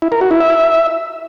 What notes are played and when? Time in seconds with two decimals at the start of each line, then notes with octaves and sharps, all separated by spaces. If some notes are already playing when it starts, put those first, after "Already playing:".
0.02 E4
0.12 A#4
0.21 F#4
0.31 E4
0.40 E5